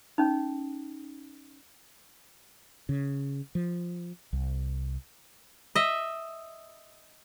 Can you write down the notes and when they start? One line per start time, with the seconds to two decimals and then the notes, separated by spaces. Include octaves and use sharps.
0.18 C#4 D#4
2.89 C#3
3.55 F3
4.33 C2
5.75 D#5 E5